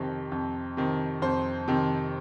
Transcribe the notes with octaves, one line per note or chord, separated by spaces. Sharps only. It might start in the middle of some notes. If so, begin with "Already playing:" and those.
Already playing: F2 C3 D#3
F2
C3 D#3
F2 C5
C3 D#3